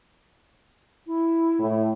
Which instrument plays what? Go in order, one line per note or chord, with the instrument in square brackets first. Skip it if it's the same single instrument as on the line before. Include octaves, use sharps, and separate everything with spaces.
[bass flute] E4
[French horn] A2